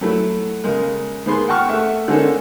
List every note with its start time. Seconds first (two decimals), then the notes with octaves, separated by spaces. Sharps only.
0.01 F#3 A3 E4
0.64 C#3 G#3 A#4
1.26 G#2 A#3 B3 G#4 C6
1.48 F#5 G5 A5 C#6 F6
1.69 A3 E5 F#5
2.08 D3 G#3 A#3 C#4 D#4 A4